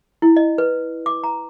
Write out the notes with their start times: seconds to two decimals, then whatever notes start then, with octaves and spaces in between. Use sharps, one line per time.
0.22 E4
0.37 D#5
0.58 B4
1.06 D6
1.24 A#5